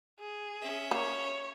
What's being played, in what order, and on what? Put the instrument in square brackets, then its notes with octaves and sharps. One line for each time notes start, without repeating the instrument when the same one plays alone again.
[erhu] G#4
[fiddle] C#4 E5
[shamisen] A#3 [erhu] C#5